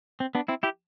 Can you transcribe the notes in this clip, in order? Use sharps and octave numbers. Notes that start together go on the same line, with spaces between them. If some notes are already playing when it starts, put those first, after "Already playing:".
C4
B3 D4
C4 E4
E4 G4